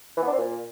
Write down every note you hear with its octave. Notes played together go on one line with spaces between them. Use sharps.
E3
B3
D4
C4
A#2